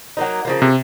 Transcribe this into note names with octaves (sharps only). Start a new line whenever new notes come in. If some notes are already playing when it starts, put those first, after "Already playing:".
F#3 A#3 D#4
C#3 F3 A#3
C3